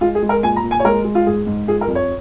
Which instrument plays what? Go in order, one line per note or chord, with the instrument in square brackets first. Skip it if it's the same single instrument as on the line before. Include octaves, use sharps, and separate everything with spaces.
[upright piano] G#3 F4
G#4
G#3
A#4
A#2 G#5
A#5
A#2
G#5
C#5
G#3 A#4
G#3
F4
G#2 G#4
G#2
F3 G#4
A#4
F2
C#5